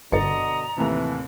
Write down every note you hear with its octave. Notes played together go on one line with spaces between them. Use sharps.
G1 B2 D3 D#5 A#5 A6 C#7
D#2 A2 C3 E3